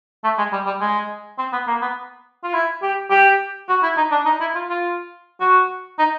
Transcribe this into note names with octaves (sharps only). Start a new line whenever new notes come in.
A3
G#3
G3
G3
G#3
C4
B3
A#3
B3
F4
E4
G4
G4
F#4
E4
D#4
D4
D#4
E4
F4
F4
F#4
D#4